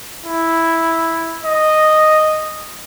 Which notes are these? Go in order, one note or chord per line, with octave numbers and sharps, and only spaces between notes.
E4
D#5